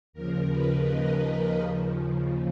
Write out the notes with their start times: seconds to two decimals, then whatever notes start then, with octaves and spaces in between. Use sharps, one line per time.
0.13 D#2 C#3 F3 A#4
0.49 B4
0.84 D#5
1.55 D#2 C#3 F3